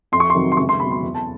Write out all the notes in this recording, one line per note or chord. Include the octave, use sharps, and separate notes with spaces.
F2 C6
C#6
C6
C3 D#3 F#3
C6
C#2 C#6
C6
B2 F#3 B5
C6
E2
A5